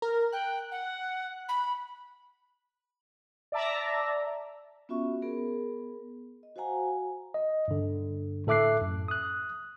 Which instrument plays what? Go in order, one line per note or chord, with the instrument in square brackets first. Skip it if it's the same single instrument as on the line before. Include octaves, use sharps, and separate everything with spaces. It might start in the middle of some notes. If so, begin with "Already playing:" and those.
[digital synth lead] A#4
[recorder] G5 [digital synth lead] F#6
[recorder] F#5
B5
[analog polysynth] D5 E5 A5 A#5
[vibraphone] B3 C#4 F4 F#4 E5 C#6
B3 G#4 A#4
D#5
F#4 C5 F5 F#5 G#5 A#5
[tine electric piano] D#5
G2 D3
A2 A4 E5 D6 F#6 C7
F#2
D#6 F#6